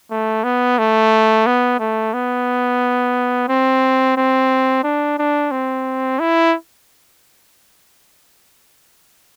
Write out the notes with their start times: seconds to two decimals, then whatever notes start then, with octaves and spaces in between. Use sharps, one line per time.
0.11 A3
0.44 B3
0.79 A3
1.47 B3
1.79 A3
2.14 B3
3.49 C4
4.17 C4
4.84 D4
5.19 D4
5.51 C4
6.20 E4